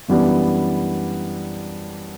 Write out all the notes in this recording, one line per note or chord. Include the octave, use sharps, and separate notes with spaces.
F#2 E3 G3 B3 D4